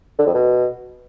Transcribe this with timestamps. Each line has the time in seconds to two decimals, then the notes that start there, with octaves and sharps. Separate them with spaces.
0.19 D3
0.27 F2
0.34 B2